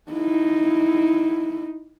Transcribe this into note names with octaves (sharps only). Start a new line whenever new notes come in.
D#4 E4